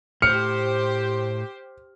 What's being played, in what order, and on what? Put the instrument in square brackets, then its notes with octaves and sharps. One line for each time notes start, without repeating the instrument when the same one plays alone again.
[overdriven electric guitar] A2 [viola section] G4 C5 [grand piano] F6 C#7